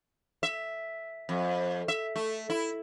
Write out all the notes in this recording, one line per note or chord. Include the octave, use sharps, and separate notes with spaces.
E5
F2
E5
A3
E4